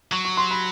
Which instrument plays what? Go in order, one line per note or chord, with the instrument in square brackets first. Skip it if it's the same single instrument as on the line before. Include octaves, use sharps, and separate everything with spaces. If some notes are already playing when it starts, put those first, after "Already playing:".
[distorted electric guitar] F#3 [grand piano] C#6
[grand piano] C#6
C6
B5